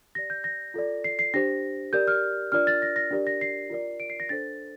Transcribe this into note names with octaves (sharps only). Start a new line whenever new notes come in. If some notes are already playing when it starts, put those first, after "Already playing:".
G4 D5 A#6
G6
A#6
F4 A4 D5
C7
C7
D4 G4 C5 A#6
G4 A#4 D5 G6
F6
D4 F4 A#4 D5 F6
A6
A#6
A#6
D4 G4 A#4 D5
A#6
C7
F4 A#4 D5
D7
C7
A#6
D4 A4 C5 A6